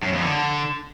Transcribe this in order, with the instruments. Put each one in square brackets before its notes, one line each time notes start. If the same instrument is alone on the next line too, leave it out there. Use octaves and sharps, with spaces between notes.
[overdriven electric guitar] F#2
F2
D3